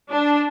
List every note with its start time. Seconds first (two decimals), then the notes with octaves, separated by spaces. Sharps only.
0.11 D4